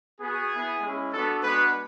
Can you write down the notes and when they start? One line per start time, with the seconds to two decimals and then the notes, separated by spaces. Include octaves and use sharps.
0.20 B3 F#4 G#4
0.51 B3 E4
0.81 G#3 C#4 E4
1.12 B3 D4 F#4 A4
1.42 G#3 B3 D4 F#4 B4